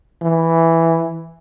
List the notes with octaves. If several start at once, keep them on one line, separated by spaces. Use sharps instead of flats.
E3